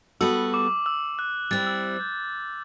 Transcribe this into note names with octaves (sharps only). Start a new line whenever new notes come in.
G3 B3 F#4 A4 E6
D6
E6
F#6
G3 C4 E4 A6
E6
F#6
G6